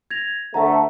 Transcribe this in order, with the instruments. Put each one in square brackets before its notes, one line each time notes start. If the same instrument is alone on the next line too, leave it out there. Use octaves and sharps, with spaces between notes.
[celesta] G#6 A#6 F7
[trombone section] D2 A3 [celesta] E5 F#5 A#5